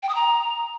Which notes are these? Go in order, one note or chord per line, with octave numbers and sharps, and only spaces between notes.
G5
D#6
A#5